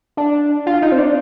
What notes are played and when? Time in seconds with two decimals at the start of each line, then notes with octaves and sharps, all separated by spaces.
0.17 D4
0.66 F4
0.82 D#4
0.92 C4
0.98 D4